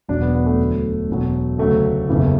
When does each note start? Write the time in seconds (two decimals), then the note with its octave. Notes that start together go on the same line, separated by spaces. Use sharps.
0.08 E1 E2 B2 F#3 D4
0.21 B3
0.34 B3
0.46 A3
0.59 D2 D3 F#3
1.09 E1 E2 B2 F#3
1.58 D2 C#3 F#3 A3
2.09 F#1 E2 C#3 E3